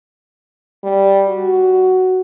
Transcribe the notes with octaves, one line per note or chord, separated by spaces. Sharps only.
G3
F#4